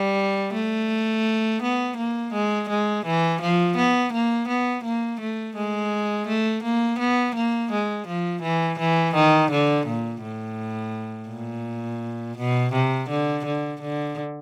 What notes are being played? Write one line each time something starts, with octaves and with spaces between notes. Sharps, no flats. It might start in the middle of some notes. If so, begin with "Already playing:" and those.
Already playing: G3
A3
B3
A#3
G#3
G#3
E3
F3
B3
A#3
B3
A#3
A3
G#3
A3
A#3
B3
A#3
G#3
F3
E3
E3
D#3
D3
A#2
A2
A#2
B2
C3
D3
D3
D3